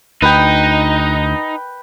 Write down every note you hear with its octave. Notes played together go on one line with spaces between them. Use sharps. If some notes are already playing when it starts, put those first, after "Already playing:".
D2 D#4 B4 G5